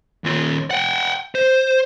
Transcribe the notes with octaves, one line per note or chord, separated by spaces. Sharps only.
D#2 F4
F#5 G5
C5